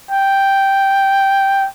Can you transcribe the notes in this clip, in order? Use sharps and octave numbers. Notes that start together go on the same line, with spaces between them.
G5